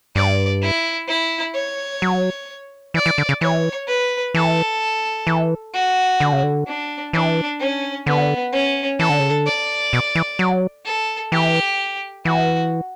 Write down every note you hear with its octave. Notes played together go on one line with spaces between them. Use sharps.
G2 D5
E4
E4
C#5
F#3
E3 D5
E3
D3
C#3
E3 C#5
B4
E3 A4
E3
F#4
D3
C#3
D3
D4
E3 D4
C#4
D3 B3
C#4
E3 A4
D3
C#3
D3
D5
B2
E3
F#3
A4
E3 G4
E3 F#4